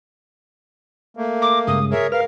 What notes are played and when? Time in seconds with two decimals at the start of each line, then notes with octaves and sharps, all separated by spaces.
1.17 A3 A#3
1.42 A#5 D6
1.67 G2 C#3 G#3 D#6
1.91 G#4 A#4 C#5 E5
2.12 A#4 B4 F5 F6